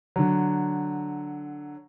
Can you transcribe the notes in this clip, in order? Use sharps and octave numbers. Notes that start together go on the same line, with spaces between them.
D3 F#3